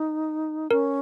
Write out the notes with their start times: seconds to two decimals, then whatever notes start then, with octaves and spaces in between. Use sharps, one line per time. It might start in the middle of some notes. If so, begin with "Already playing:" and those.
Already playing: D#4
0.71 C#4 A#4